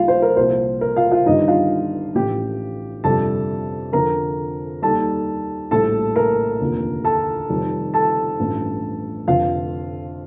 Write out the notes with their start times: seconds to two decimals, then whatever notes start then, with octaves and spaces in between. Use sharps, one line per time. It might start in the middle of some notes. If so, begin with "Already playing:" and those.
Already playing: D#2 D#3 G3 F4 F5
0.08 C5
0.22 A#4
0.37 C2 A#2 F3 C5
0.81 A#4
0.96 F4 F5
1.11 F4 F5
1.26 G1 G2 D#3 G3 D#4 D#5
1.48 F4 F5
2.15 A1 A2 F3 G4 G5
3.04 G1 F2 C3 G3 A4 A5
3.93 F2 D3 F3 A#4 A#5
4.82 D#2 D#3 G3 A4 A5
5.71 A#1 A2 G3 A4 A5
6.16 A#4 A#5
6.60 F1 D#2 D3 F3
7.04 A4 A5
7.49 F1 F2 D#3 G3
7.94 A4 A5
8.39 A1 G2 F3
9.27 F1 F2 D3 F4 F5